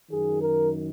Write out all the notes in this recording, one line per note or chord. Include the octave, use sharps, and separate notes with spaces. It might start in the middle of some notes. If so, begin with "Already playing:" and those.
F#2 D#3 G#4
A#4